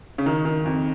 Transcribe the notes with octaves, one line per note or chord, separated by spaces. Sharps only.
C#3
D#3
D#3
F2